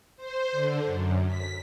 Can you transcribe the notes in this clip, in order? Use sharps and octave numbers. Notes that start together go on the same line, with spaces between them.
C5
D3
F#2
B6